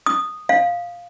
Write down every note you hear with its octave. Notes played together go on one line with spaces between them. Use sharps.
D#6
F5